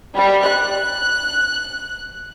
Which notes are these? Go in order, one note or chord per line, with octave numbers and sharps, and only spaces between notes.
G3
F#6